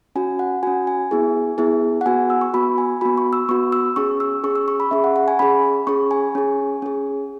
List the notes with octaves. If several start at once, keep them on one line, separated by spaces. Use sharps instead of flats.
C#4 F#4 G#5
F#5
C#4 F#4 G#5
G#5
B3 E4 G#4
B3 E4 G#4
F#5
B3 F#4 G#5
E6
C#6
B3 F#4 B5
G#5
B3 F#4 B5
C#6
E6
B3 F#4 C#6
E6
C#4 G#4 C#6
E6
C#4 G#4 C#6
E6
C#6
B5
C#4 G#4 E5
F#5
F#5
G#5
C#4 G#4 B5
C#4 G#4 C#6
G#5
C#4 G#4
C#4 G#4